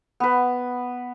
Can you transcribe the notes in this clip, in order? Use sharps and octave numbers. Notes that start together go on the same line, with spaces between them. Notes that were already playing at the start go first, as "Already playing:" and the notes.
B3 B4